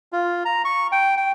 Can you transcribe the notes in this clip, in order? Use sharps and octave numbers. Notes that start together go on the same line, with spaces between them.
F4
A#5
C#6
G5
G5